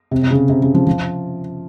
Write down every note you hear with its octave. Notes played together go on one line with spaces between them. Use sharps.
C3
C3
C#3
C3
C#3
F3
F3